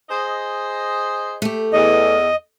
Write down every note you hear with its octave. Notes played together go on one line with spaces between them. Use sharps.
G#4 C5 D#5
A3 G4
E2 D#5